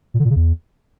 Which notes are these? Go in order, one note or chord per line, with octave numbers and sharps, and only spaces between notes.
A#2
D3
A#2
C#3
E2